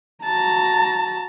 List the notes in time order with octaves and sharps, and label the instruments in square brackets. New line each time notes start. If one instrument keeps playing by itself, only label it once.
[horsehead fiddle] F#4 A#5 [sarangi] A5